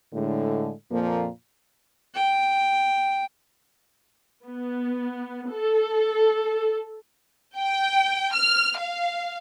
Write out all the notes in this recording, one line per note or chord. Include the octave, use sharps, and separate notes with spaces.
A2 D3 G#3
F2 A#2 F3 A#3
G5
B3
A4
G5
F6
F5